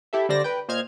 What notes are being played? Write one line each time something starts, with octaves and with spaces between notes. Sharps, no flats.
E4 G4 A4 E5
D3 G3 D4 C5 D5 A#6
B4 G5
A#2 C5 D#5 F6 G#6